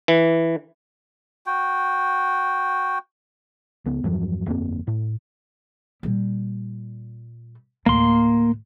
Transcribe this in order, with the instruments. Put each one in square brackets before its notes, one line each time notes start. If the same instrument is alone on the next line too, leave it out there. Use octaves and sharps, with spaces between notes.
[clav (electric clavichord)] E3
[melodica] F#4 G5
[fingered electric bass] C#2 B3
E2 G2 F3 F#3
G1 F2 A#3 C4
A2
[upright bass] A#2 G3
[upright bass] D2 A2 [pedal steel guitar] A#3 C6